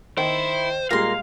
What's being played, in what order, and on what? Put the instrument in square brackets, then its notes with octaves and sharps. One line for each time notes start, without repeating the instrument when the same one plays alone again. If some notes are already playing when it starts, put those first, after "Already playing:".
[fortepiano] D#3 [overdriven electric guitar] E4 [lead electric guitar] C5
[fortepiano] A#2 G3 G#3 [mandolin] A#4 C6 [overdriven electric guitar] F5